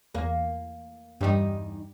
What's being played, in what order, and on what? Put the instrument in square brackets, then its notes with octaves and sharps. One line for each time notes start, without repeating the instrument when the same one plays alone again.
[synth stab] E2 [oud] A#3
[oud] E2 D#4 [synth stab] G2 G3